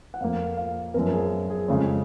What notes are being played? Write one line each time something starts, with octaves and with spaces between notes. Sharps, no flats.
F#5
F2 F3 A#3 F5
F5
F#2 F3 B3 A#4
G#4
G#4
F2 C#3 G#3